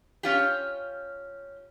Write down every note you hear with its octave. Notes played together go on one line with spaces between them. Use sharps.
C#4 F4 G4